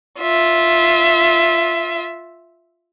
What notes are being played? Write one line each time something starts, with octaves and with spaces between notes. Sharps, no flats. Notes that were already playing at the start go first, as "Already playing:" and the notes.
F4 E5